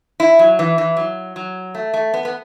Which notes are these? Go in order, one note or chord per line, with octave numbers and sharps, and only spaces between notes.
E4
F#3
E3
E3
F#3
F#3
A3
A3
B3
B3